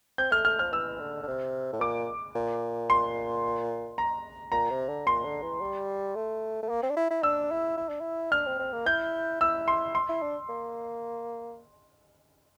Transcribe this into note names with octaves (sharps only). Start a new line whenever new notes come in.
C4 G6
A3 F6
A3 F6
F3 F6
E3 E6
D3
D3
C3
A2
A#2 D6
A#2
C6
A#5
A#2 A#5
C3
D3
A#2 C6
D3
E3
G3
A3
A3
A#3
C4
D4
E4
E4
D4 E6
E4
E4
D4
E4
D4 F6
C4
C4
A#3
E4 G6
E4 E6
C6
C6
E4
D4
A#3